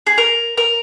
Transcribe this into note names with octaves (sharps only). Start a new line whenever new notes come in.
G#4
A#4
A#4